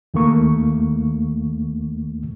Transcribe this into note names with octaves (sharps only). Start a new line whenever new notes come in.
D#2 D#3 A3 A#3 C#6